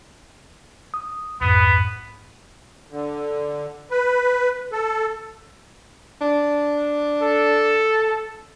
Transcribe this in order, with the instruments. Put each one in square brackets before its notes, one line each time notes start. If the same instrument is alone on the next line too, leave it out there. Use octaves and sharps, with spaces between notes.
[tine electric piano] D#6
[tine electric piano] A#1 F2 G#2 [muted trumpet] B3
[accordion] D3
B4
A4
[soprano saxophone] D4
[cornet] A4